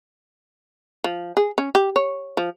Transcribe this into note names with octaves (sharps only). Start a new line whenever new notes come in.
F3
G#4
C#4
G4
C#5
F3